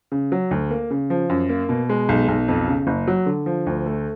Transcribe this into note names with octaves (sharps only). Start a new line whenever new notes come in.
C#3
F#3
D2
A#3
C#3
F3
F#2
A#3
B2
G#3
B1
B1
F2
C#3
F#1
F#3
D3
F3
D2
A3